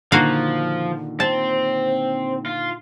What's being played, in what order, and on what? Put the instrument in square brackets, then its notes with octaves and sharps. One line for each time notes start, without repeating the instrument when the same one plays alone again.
[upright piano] A#2 D3 D#3 [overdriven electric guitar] F3 [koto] A#3 F#4 F5
[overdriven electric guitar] C4 [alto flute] C5 [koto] A5
[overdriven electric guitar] F4